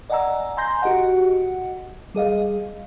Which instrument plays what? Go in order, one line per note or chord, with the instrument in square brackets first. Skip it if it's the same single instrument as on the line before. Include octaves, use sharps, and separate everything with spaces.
[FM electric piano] D5 D#5 F#5 G#5 A#5 E6
G#5 A#5 C6 G6 A#6
F#4 G4 D#5 F#5
G3 G#4 D#5 F5